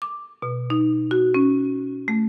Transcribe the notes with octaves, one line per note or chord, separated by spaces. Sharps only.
D6
B2
D#4
F#4
C#4
A3